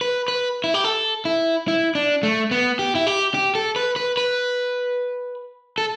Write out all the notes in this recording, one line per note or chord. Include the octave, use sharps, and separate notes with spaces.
B4
B4
E4
G4
A4
E4
E4
D4
A3
B3
G4
E4
G4
G4
A4
B4
B4
B4
A4